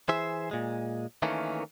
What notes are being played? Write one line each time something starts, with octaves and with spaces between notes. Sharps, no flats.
E3 G#4 C5 E5
A#2 G#3
D#3 E3 A3 A#3 C#4